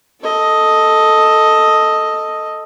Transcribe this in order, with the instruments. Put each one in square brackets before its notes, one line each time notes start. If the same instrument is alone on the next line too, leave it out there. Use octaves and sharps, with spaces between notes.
[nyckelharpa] A4 D#5